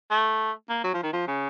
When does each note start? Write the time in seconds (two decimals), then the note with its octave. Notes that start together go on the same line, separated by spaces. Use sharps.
0.11 A3
0.69 A#3
0.84 F#3
0.94 F3
1.03 D#3
1.13 F3
1.27 C#3